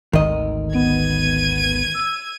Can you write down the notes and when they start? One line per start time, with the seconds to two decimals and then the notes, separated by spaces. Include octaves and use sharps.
0.13 G#1 D2 D#3 D#5
0.74 B3 G#6 D#7
1.94 E6